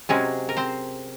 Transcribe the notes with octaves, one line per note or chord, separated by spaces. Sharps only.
C3 F#3 G#3 C#4 G#4
A#4
C4 C5